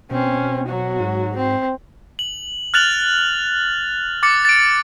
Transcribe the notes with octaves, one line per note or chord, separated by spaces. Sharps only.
B2 C4 C#4
F#3 F#4
G#2
C4
F#7
F6 F#6 A6 F7 F#7
D6 A6 C#7
A6 D7